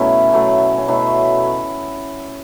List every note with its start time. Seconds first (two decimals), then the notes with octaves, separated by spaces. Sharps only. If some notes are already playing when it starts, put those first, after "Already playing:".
Already playing: B2 F#3 A3 C#4 E4
0.33 B2 F#3 A3
0.78 C#4
0.88 B2 F#3 A3 E4